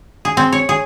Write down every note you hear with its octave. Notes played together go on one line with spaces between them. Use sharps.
G#4
C4
C#5
G#4